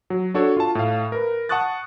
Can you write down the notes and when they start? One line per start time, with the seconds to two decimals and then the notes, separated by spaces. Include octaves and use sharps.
0.10 F#3
0.34 D4 F#4 A4 C#5
0.57 F4 A5
0.75 A2 F5
1.12 A#4 B4
1.49 F#5 A5 C#6 D#6 F#6 A6